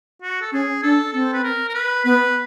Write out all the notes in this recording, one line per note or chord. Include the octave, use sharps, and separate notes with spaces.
F#4
A4
C#4 G#4
D4 A4
C4 A4
B4
A#4
A#4
B4
B3 B4